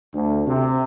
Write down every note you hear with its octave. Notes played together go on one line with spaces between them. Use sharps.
D2
C3